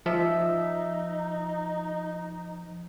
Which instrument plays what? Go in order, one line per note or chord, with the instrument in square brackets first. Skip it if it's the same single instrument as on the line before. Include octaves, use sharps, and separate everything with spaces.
[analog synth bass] F3 [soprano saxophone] D#4 [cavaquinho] E5